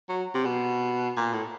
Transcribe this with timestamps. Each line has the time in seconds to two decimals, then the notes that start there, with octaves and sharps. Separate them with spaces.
0.09 F#3
0.34 C3
0.45 B2
1.17 A#2
1.33 A2